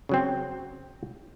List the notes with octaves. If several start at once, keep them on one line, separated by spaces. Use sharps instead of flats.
C#3 F#3 C4